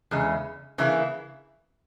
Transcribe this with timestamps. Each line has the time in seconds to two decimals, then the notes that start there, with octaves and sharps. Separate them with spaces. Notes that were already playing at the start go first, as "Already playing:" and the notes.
0.11 E2 C#3 G#3
0.78 C#3 E3 A#3 E4 G#4